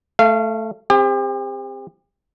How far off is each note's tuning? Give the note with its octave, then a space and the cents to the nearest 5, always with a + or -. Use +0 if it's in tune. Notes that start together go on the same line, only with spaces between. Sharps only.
A3 +0 F5 -30
C4 +0 G4 +40